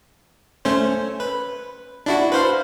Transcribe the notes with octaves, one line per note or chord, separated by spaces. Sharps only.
A3 C#4 C5
B4
D4 E4 F#4
B4 C5 F5